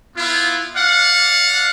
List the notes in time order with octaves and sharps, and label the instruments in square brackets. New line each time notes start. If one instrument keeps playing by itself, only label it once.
[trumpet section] B3 E4 F4
D5 F5 F#5